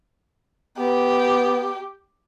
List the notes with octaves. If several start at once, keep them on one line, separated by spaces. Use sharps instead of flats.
B3 G4